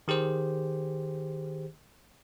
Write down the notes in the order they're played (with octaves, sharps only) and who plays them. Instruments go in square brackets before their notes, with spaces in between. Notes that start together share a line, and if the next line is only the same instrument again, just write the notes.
[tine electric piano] D#3 G4 G#4 C5